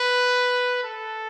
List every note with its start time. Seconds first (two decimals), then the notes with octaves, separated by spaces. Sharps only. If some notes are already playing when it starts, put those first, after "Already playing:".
Already playing: B4
0.84 A4